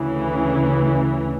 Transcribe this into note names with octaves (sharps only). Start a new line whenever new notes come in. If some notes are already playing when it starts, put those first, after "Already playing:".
Already playing: D2 C#3 E3